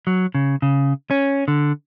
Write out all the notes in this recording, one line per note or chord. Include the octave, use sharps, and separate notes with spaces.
F#3
C#3
C#3
C#4
D3